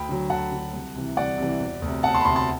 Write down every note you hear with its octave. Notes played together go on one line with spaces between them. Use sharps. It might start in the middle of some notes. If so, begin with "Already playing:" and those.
Already playing: D2 G5 B5
D3 F#3
D2 F#5 A5
D3 F#3
C2
C3 E3
C2 D5 F#5
C3 E3
E1
D2 C3
E1 F#5 A5
A5 C6
B5
D2 C3 A5 C6
A5 C6